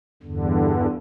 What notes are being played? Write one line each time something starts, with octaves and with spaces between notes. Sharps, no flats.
E2 G2 D3